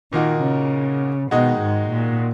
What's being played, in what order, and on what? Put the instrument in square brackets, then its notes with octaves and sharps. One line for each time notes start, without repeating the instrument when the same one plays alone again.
[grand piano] A#2 A#3 D#4 F#4 [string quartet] D#3
[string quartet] C#3
[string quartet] B2 [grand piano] D#3 G#3 D#4 F#4
[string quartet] G#2
A#2